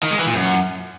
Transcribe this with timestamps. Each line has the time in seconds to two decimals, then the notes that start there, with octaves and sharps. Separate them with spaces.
0.03 D#3
0.11 G#3
0.19 E3
0.27 A#2
0.35 F#2